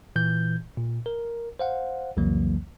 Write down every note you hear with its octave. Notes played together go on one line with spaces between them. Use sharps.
A#2 E3 G6
A#2
A#4
C5 F5 F#5
C2 F2 C#3 E3 F#3 A#3